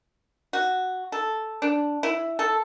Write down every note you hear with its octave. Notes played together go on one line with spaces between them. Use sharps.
F#4
A4
D4
E4
A4